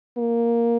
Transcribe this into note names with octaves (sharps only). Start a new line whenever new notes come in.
A#3